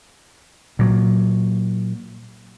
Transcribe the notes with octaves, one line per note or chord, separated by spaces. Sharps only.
A#2 F#3